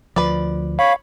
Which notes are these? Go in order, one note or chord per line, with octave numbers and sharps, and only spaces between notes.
D2 F3 B4 D5
C#5 F5 B5